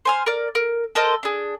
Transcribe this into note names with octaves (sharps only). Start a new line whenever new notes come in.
C5 G#5 F6
A#4 D5
A#4
A4 A#4 C5 D#5
D4 G#4